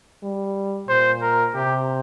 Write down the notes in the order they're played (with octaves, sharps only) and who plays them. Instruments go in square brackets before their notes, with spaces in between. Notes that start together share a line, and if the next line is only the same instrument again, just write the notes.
[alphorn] G3
[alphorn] A#2 [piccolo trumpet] C5
[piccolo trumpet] A#4
[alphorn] C3 [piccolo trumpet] G4